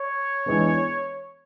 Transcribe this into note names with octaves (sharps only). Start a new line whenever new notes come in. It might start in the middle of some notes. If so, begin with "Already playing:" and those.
Already playing: C#5
E3 G#3 B3 D4